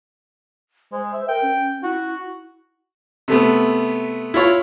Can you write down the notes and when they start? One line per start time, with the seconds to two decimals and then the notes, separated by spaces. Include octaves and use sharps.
0.92 G#3 C5
1.13 E5
1.28 A#4 G5
1.42 C#4
1.83 E4 F#4
3.28 C3 A3 B3
4.34 E4 F4 C#5